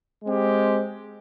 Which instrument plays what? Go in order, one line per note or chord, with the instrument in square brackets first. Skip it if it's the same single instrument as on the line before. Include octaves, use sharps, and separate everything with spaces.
[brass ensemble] G#3 C4 G4